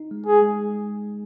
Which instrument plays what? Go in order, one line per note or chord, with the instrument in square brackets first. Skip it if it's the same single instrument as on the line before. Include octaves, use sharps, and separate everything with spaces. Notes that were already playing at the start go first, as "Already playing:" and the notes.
Already playing: [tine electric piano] D#4
G#3
[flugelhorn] G#4
[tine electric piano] G#3